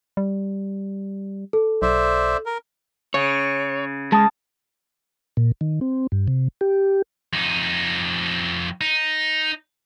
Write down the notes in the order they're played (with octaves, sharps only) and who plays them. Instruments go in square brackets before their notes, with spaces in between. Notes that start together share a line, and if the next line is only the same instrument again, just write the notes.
[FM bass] G3
[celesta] A4
[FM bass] B1 [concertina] C5 D5 E5
[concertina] A#4
[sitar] C#3 [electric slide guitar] C#5
[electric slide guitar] G#3 [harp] A5 D#6 F6
[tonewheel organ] A#2
D#3
C4
G2
C3
G4
[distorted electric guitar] F2 D#4
D#4